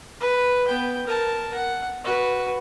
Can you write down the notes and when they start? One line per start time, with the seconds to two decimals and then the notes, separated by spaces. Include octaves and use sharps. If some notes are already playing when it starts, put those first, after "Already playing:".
0.20 B4
0.68 B3 G5
1.07 A#4 A5
1.54 F#5
2.04 F#4 B4